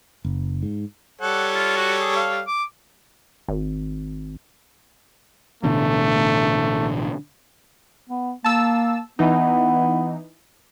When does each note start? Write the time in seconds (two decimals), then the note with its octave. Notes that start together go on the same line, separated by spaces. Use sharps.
0.24 F#1
0.63 G#2
1.21 G3 A4 C#5 F#5
1.54 F4
1.77 F#4
2.01 G#4
2.16 F5
2.47 D6
3.48 G#1
5.63 A1 B2 D3 A3
8.09 B3
8.44 A#3 A5 E6
9.19 E3 B3 D#4